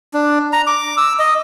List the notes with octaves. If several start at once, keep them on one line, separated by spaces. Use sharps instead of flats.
D4
A#5
D6
E6
D#5